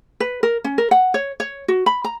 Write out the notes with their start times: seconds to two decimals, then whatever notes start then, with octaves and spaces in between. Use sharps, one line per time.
0.20 B4
0.43 A#4
0.64 C#4
0.78 A#4
0.91 F#5
1.14 C#5
1.40 C#5
1.68 F#4
1.86 B5
2.04 A#5